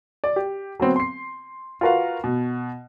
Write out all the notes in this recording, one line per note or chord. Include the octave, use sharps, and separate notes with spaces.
D5
G4
F#3 B3 C4
C6 C7
F4 F#4 A#4 B4 F5
B2